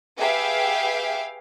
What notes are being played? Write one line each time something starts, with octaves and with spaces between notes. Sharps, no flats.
G4 G#4 B4 E5 F5 G5